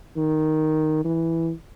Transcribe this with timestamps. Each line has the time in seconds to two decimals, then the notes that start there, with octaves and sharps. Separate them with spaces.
0.16 D#3
1.05 E3